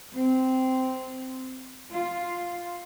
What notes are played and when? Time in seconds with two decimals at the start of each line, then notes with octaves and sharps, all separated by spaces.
0.13 C4
1.92 F4